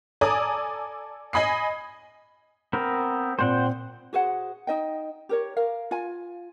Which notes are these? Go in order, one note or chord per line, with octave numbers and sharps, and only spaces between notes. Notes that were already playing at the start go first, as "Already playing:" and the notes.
A4 D5 G#5 A#5 D6 D#6
D#5 G#5 B5 D#6 C7
B3 C4 A#4
A#2 C4 C5 F#5 G5
F#4 G#4 C5 F#5
D#4 D#5 G5
G4 A#4 C#5
A#4 F5
F4 G#5